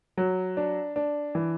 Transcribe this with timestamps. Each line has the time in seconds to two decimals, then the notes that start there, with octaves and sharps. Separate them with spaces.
0.17 F#3
0.57 D4
0.96 D4
1.35 E3